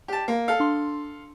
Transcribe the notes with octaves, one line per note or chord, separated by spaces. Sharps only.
G4 A5
A#3
A4 F5
D4 C6